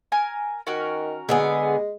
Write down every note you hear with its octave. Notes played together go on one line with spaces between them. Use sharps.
A#4 G#5 F6
D#3 C#4 F#4 A#4
D3 G#3 B3 G#4